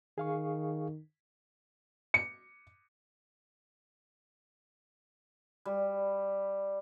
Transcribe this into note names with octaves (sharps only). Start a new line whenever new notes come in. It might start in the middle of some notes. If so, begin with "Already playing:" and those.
D#3 G#4 F5 C#6
C#7
G3